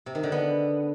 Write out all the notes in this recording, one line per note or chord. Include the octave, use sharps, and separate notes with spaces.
C3
D#3
D3
B3